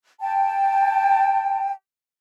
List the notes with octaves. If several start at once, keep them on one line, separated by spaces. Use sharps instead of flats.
G5 A5